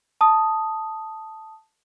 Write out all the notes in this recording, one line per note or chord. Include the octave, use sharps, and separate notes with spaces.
A5 D#6